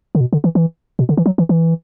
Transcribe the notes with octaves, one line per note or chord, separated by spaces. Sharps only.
D3
B2
D3
E3
E3
B2
D3
E3
F#3
E3
E3